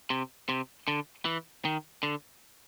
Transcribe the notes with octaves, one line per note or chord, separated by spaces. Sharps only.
C3
C3
D3
E3
D#3
D3